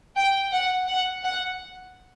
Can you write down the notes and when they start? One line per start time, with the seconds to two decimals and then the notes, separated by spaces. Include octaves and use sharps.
0.16 G5
0.52 F#5
0.88 F#5
1.24 F#5